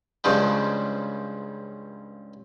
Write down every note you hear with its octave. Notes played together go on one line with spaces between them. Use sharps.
C#2 G2 C#3 F3 G3